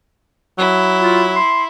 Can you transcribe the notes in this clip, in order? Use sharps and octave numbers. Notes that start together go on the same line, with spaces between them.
F#3 E4
F4
C6